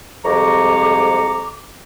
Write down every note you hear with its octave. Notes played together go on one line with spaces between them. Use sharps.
C2 F2 G#2 A#5 C#6 D6